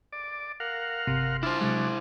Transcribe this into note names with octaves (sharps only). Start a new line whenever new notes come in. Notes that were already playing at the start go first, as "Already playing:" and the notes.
D5
A#4 F5 F#5
G1 C3 C7
D4 E4 F4 C5
C3 F#3 G#3 D4